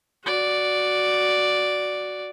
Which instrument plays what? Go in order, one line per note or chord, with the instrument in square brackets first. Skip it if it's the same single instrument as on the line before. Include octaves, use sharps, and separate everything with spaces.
[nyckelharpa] F#4 D5